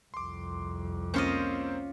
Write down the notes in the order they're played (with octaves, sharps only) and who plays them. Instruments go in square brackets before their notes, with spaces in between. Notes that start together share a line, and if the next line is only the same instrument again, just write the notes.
[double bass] C2 F2 [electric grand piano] C6 D6
[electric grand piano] A#3 C4 C5 [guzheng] C#4 F4 D#5